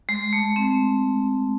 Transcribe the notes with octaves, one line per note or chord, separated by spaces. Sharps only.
G#3
A3
C4